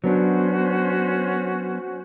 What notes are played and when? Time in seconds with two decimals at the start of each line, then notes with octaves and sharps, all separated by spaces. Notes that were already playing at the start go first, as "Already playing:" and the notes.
0.04 F#3 B3 C#4 D4 F#4 C5